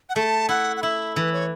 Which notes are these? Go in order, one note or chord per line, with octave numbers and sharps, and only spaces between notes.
F#5
A3 A5
E4 F#5
F#5
E4 E5
E3 B4
C#5